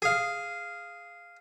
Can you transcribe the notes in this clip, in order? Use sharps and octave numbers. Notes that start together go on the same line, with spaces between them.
G#4 F5